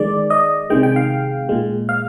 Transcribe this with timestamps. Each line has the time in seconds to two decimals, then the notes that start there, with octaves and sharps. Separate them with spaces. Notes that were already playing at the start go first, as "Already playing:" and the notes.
Already playing: D#3 G#3 D5
0.30 D#5
0.70 C3 D#3 G#3 G5
0.83 G5
0.96 F5
1.49 A#2 G#3
1.89 F5